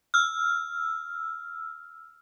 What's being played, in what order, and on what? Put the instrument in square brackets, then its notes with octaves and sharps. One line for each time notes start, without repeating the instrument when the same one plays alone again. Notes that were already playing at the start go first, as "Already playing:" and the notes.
[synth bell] E6 F6